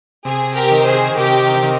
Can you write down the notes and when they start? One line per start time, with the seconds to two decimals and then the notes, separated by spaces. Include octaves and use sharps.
0.25 C3 G#4
0.55 G4 A#4
0.71 D#3
0.86 G#4 C5
1.17 C3 G4 A#4
1.63 D#3